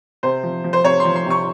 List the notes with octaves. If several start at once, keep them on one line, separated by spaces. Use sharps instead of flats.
C3 C5
F3
F3
C5
C3 C#5
C6
F3
C6
C3 C#6